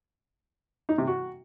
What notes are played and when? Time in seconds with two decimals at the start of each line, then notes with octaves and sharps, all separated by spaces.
0.89 D#4
0.98 C3
1.07 F#4